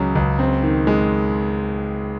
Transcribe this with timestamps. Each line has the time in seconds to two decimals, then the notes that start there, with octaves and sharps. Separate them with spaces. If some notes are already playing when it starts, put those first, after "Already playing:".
Already playing: C#2 C#3 F#3
0.15 C#2
0.39 C4
0.63 D#3
0.87 G#3